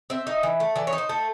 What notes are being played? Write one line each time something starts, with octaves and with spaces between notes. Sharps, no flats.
C4 E5
D#4
E3
A3
E3 D5
C#5
D#4
C5
A3